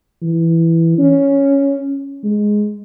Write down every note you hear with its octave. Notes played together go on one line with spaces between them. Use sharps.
E3
C#4
G#3